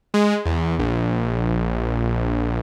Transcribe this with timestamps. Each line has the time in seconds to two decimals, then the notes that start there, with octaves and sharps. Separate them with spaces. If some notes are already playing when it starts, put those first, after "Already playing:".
0.14 G#3
0.45 E2
0.79 A#1